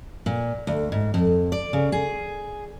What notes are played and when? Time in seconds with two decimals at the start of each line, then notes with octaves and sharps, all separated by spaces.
0.26 A#2
0.67 D2
0.92 G#2
1.14 F2
1.52 D5
1.73 C#3
1.92 G#4